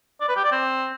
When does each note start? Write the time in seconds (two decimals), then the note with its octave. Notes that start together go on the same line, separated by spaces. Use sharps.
0.21 D5
0.28 B4
0.36 G4
0.44 D5
0.52 C4